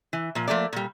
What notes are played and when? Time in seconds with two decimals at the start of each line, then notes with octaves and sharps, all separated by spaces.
0.13 E3
0.35 A#2 F3
0.48 F3 A3 A#3 D5
0.73 A#2 G3